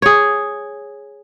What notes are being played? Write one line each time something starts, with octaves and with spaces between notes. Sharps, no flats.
G#4 C#5